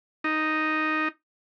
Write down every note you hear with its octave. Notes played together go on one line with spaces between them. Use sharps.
D#4